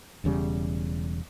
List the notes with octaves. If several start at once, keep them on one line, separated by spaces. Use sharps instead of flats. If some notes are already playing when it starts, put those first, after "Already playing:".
E1 E2 C#3 G3